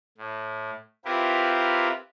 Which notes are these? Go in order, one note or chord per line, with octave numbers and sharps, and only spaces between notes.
A2
C4 E4 F4 G4 A#4 B4